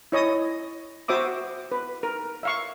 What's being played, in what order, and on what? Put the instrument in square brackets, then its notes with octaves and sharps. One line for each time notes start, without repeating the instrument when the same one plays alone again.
[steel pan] E4 C#5 D#5 D#6
F#4 C5 E5 D6 D#6
B4
A#4
E5 F5 C#6